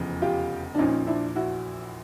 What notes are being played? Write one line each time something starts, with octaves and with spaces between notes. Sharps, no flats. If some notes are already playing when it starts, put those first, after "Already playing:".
Already playing: F1 E2 C#3 F3
F4 G4
D4
A#1 A#2 F3 C#4 D#4
D4 E4
E4 F#4